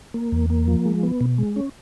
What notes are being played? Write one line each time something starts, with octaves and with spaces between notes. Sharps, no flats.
A#3
E2
A#3
F3
G#3
B3
B2
G#3
C#4